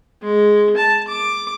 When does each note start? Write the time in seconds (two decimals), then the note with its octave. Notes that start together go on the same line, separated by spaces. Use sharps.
0.22 G#3
0.77 A5
1.07 D6